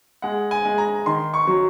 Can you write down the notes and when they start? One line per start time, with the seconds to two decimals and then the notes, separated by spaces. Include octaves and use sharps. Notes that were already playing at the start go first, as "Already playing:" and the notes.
0.22 G#3 F#5
0.51 G#5
0.65 G#3
0.78 A#5
1.06 D#3 C6
1.34 C#6
1.47 F#3